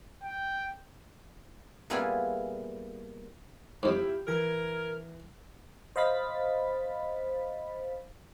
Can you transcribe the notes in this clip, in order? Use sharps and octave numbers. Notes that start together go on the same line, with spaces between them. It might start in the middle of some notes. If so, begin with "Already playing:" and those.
G5
A#2 G3 B3 E4 F4 G#4
F2 G#2 E4 F4 G4
E3 A#4 G#6
C5 D#5 F5 B5 A6 B6